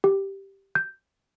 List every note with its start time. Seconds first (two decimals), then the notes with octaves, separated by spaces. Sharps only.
0.04 G4
0.75 G6